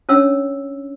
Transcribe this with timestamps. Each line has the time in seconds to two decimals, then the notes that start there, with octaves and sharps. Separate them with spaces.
0.09 C#4 D4 C#5 E6